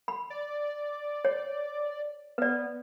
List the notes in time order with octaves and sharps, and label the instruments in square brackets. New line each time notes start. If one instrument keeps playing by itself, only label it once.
[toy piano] B5
[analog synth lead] D5
[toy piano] C#5
[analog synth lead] B3 [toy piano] B4 D5